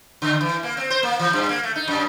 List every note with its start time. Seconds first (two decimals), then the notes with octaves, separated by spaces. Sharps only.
0.22 D3
0.41 E3
0.63 A#3
0.77 C4
0.90 C5
1.03 A#3
1.19 E3
1.33 G2
1.49 A#3
1.63 A3
1.76 D#4
1.88 F#2